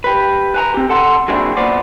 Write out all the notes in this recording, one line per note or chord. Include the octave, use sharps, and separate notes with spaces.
G4 B4
B4 G#5 A#5
C4 G4
A4 F#5 A5 C6
F#3 A#3 C4 D4 E4 G#4
A#2 B3 C5 D5